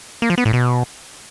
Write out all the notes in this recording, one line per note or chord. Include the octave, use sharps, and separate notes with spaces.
A#3
F3
B3
A2
B2